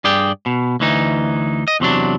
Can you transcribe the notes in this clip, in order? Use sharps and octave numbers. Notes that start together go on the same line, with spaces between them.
G2 G#4 D5 G5
B2
D2 E3 D#4
D#5
E2 C3 F#3 D4